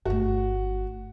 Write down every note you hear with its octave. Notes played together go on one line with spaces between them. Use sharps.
G1 A3 F#4